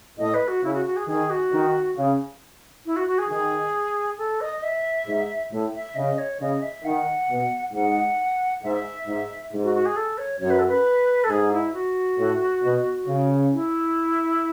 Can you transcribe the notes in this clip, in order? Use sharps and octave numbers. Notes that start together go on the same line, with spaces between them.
A2 D#5
B4
F#4
C#3 E4
F#4
F#4
G#4
D#3 G#4
F#4
D#3
C#3
E4
F#4
F#4
G#4
D#3 G#4
A4
D#5
E5
G#2
A2
E5
C#3 D#5
C#5
C#3 D#5
E5
D#3 F#5
B2
G#2 F#5
G#2 E5
G#2
G#2
F#4
F#4
G#4
A4
C#5
F#2 C#5
B4
A4
B4
A4
G#2 G#4
E4
F#4
A2
B2
C#3
E4